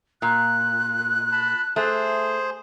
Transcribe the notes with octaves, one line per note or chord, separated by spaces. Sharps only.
A#2 F#6
A5 B5
A3 G#4 C5